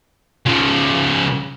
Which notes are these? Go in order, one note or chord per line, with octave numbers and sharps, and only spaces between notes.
C#3 F3